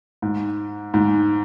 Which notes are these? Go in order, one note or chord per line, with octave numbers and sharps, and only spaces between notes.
G#2
G#2